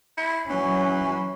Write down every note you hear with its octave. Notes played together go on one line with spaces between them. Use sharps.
E4
E3 F#3 C#4